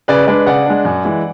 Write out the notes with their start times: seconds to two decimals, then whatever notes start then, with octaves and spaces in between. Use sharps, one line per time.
0.08 C#3 B4 D5
0.27 G#3 D4 B4 D5
0.46 C#3 D5 F#5
0.66 G#3 D4
0.85 F#2
1.05 E3 G#3